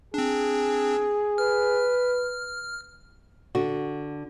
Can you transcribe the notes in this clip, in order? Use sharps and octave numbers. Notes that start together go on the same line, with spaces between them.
C4 D4 G#4
B4 F6
D3 F#4